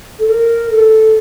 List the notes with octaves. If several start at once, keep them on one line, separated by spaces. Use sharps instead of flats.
A4
A#4
A4